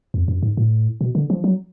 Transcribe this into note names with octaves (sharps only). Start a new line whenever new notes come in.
F2
F#2
G#2
A2
B2
D3
F3
F#3